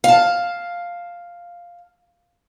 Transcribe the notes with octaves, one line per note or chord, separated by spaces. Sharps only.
F5 A5